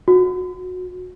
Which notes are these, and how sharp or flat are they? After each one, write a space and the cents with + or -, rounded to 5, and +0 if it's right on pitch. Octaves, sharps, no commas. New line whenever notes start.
F#4 -20